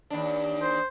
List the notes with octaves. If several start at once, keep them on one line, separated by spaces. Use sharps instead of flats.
D#2 D4
C5